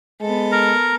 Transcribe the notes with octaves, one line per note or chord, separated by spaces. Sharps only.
G#3 B3 A4
A#4 A#5